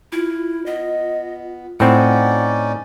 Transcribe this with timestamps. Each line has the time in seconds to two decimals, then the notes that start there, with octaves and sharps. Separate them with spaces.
0.13 E4 F4
0.66 B3 D#5
1.80 A2 C4 C#4 D#4 D5 F#5